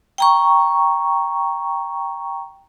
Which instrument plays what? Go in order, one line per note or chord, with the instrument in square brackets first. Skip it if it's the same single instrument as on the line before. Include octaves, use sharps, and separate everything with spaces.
[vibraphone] G5 A#5 C#6